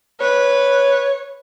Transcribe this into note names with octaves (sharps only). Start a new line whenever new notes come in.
B4 C#5